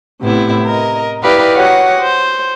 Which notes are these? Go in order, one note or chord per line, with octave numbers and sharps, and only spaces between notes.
A2 C3 B3 E4
A#4 D#5
E4 G4 B4 D5 D#5 F5
F#4 G4 C#5 D#5 F#5
C5